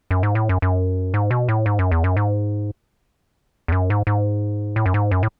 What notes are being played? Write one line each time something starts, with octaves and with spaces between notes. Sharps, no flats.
F#2
G#2
A2
F#2
F#2
G#2
B2
A2
G#2
F#2
E2
F#2
G#2
E2
F#2
G#2
G#2
A2
F#2
G#2
F#2
A2